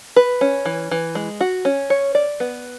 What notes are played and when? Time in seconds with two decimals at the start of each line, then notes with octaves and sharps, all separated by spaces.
0.16 B4
0.41 C#4
0.66 E3
0.91 E3
1.15 G#3
1.41 F#4
1.65 C#4
1.90 C#5
2.15 D5
2.40 B3